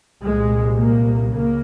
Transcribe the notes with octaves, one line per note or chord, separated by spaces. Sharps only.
C2 A#2 G#3
A#3
C#2 C#3 A#3